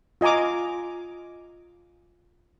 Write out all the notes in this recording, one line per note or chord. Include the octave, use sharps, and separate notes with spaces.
F4 D#5 G#5 A#5 D6